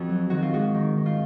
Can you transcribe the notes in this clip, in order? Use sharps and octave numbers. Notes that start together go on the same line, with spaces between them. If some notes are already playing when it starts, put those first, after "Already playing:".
Already playing: F2 F#4
F#3
D#3 F#4
F4
G#2 F#4
D#3
D#3
F4